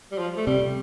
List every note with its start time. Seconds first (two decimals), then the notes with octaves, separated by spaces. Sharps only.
0.12 G3
0.18 F3
0.37 A3
0.47 C3 G3